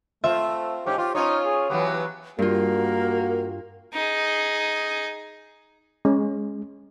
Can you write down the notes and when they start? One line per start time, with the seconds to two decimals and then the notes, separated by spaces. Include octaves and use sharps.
0.24 A3 C4 F4 E5
0.86 G#2 C#4 G4
0.98 F4 G4
1.15 C#4 D#4 F4 C#5
1.45 G#4
1.70 E3 F#3 B3 G4
2.39 G2 A#3 F4 F#4 A#4
3.94 D#4 G#4
6.05 G#3 C#4